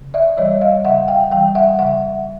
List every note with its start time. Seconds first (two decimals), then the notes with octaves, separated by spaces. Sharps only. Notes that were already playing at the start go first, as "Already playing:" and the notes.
Already playing: C#3
0.14 D5 E5
0.37 E3 G3 C#5 D#5
0.61 D#5 F5
0.84 C#3 E5 F#5
1.08 F5 G5
1.31 E3 G3 F5 G5
1.55 E5 F#5
1.79 C#3 E5 F#5